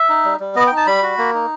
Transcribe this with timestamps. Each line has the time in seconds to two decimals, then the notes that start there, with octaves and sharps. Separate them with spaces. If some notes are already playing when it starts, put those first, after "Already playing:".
Already playing: E5
0.09 D#4
0.25 G3
0.40 G3
0.55 B3 D#5
0.67 G5
0.71 D#4
0.77 A5
0.87 G3 B5
1.03 F#4
1.18 A#3
1.34 D#4